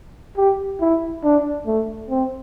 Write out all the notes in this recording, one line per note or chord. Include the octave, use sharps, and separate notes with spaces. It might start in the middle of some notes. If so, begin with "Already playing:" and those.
G4
E4
D4
A3
C4